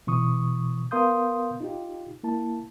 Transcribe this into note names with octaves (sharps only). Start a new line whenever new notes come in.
B2 E3 C#6 D#6
B3 A#4 F5 C6 D#6 G6
D#4 F4 G4
A#3 E4 A5